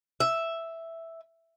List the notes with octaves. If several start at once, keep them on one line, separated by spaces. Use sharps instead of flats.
E5